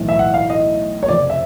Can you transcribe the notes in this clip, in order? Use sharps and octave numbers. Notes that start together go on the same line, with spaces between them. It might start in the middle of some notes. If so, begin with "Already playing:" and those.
Already playing: B1 A2 E3
E5
F#5
F5
D#5
C#5
F1 F2 C#3 F3 D5
E5